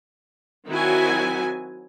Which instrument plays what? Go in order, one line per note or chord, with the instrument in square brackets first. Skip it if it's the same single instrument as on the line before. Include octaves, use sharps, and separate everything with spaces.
[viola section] D#3 F#3 C4 E4 F#4 G#5